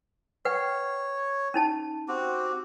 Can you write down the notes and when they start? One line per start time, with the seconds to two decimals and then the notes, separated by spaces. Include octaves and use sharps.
0.45 B4 C#5 F#5 G5
1.54 C#4 D#4 A5
2.08 C4 F#4 G4